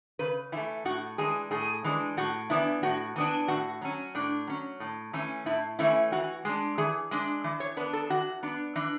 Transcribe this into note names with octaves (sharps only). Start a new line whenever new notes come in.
C#3 B4
E3 A3 E4
A2 F#4
E3 G#3 D4 G#4
A2 G#4
E3 G#3 D4
A2 F#4
E3 B3 D4 E4
A2 F#4
E3 B3 D4
A2 F#4
F#3 C#4
A2 D4
F#3 C#4
A2
E3 A3 C#4
A2 E4
E3 A3 C#4 E4
E3 F#4
G#3 D4
E3 G#4
G#3 D4
E3
C#5
B3 D4 B4
A4
E3 F#4
B3 D4
E3 D4